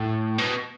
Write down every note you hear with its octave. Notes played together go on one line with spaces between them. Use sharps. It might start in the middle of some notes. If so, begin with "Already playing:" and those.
Already playing: A2
B2